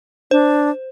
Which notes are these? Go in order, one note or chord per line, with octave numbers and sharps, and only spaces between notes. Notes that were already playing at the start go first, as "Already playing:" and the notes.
D4 C5